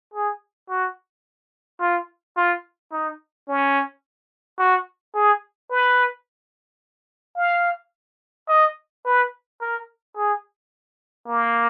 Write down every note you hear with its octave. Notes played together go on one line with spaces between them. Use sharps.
G#4
F#4
F4
F4
D#4
C#4
F#4
G#4
B4
F5
D#5
B4
A#4
G#4
A#3